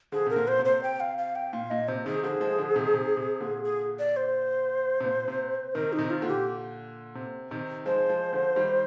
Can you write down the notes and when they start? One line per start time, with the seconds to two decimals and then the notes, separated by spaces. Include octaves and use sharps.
0.12 D3 F3 G#4
0.26 C3 A#4
0.36 A#2 D3
0.48 C5
0.59 C3
0.65 C5
0.83 G5
1.00 F5
1.18 F5
1.36 G5
1.53 A#2 F5
1.70 A#2 D#5
1.88 C3 C5
2.06 C3 D#3 G#4
2.23 D3 F3 G#4
2.41 F3 G#3
2.58 D3 F3
2.76 C3 D#3
2.94 C3
3.17 C3
3.40 A#2 D3
3.64 G#4
3.99 D5
4.17 C5
5.00 C3
5.05 A#2
5.28 C3
5.74 C3 D#3 A#4
5.93 D#4
5.98 C3 D#3
6.10 F4
6.22 A#2 D3
6.28 G4
7.15 C3
7.51 C3 D#3
7.86 F3 G#3 C5
8.09 F3 G#3
8.33 D3 F3
8.56 D#3 G3